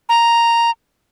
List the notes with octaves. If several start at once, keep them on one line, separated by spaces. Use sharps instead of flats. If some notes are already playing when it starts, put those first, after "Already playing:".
A#5